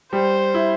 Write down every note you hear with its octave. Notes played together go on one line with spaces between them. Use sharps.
G3 C5
E4